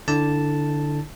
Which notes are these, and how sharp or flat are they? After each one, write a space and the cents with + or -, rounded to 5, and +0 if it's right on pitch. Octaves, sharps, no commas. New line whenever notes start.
D3 +0 E4 -20 A5 +0